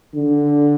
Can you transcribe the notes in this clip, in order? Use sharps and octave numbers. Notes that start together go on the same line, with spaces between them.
D3